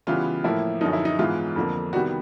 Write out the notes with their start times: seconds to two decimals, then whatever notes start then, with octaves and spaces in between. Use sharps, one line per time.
0.07 C#3 E3 G3 B3 F4
0.44 A2 F3 A#3 E4
0.81 F#2 D3 F3 D#4
0.93 E4
1.05 D#4
1.19 G#2 E3 G#3 B3 F4
1.56 F2 D3 F3 A#3
1.93 C3 D#3 G3 B3 F#4